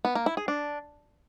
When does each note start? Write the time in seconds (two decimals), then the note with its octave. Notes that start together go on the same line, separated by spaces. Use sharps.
0.05 B3
0.15 A#3
0.26 E4
0.37 G#4
0.48 D4